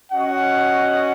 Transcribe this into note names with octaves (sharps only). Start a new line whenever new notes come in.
C#4 F#4 D#5 F#5